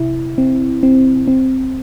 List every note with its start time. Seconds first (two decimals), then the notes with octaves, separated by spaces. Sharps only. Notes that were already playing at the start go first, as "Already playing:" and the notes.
Already playing: C3 E4
0.38 C4
0.83 C4
1.28 C4